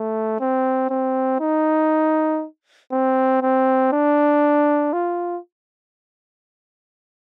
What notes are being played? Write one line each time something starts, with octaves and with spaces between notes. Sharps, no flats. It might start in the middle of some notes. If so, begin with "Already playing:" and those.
Already playing: A3
C4
C4
D#4
C4
C4
D4
F4